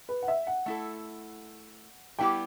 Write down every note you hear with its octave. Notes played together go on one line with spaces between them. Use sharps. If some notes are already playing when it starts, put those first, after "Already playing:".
B4
F#5
E5
F#5
A3 E4 A4
G3 B3 E4 G4 G5